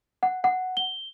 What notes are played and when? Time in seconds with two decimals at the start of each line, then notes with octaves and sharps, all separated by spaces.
0.23 F#5
0.44 F#5
0.77 G7